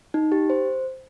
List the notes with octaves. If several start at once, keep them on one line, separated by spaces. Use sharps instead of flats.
D#4
G4
C5